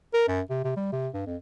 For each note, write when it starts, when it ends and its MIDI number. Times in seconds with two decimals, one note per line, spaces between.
0.13 0.25 70
0.28 0.41 42
0.50 0.64 48
0.64 0.72 48
0.76 0.88 55
0.92 1.08 48
1.14 1.22 43
1.26 1.36 41